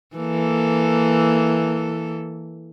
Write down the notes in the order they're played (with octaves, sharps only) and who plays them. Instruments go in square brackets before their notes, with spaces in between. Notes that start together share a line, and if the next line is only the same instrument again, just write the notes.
[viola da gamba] E3 A#3 A4